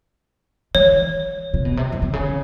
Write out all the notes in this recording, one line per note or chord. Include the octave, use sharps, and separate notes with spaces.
E3 C#5
C3
B2
C3
C#3
C3
C#3